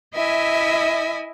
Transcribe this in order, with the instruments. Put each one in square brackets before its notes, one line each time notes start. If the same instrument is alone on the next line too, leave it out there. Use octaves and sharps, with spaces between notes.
[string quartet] E4 D#5 E5 G#5